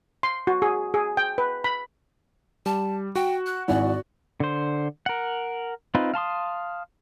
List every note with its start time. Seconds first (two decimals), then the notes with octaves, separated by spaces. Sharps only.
0.23 C6
0.47 F#4
0.62 G#4
0.94 G#4
1.17 G5
1.38 B4
1.64 B5
2.66 G3 A5
3.15 F#4 G5
3.46 F#6
3.68 G#1 E4 D5 F#5 G#5
4.40 D3 C5
5.06 A#4 F#5
5.95 C4 D#4 F4 B4
6.14 F5 A5 C6 D#6